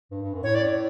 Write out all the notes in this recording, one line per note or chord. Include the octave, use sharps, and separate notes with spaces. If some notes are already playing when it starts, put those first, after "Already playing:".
G2
G2
F#2
A2 C#5
D5